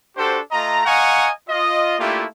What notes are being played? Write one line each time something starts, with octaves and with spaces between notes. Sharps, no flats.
D4 F#4 G4 A4 C5
A3 F4 D#5 A#5
D#5 F5 F#5 G#5 A#5 C#6
F4 D#5
A3 A#3 D4 E4 F4 G4